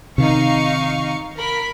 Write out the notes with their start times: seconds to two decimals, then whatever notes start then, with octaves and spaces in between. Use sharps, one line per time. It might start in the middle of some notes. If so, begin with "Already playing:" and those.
0.18 C3 D#3 D#4 F5 C#6
1.37 A#4 B5 B6